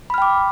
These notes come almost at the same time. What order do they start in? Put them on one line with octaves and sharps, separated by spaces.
B5 F6 G5 D6